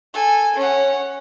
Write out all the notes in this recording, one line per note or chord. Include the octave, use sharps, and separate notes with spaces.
A4 G#5
C#4 F#5